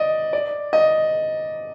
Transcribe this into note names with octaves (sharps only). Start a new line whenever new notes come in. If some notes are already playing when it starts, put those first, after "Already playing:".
Already playing: D5 D#5
D5
D#5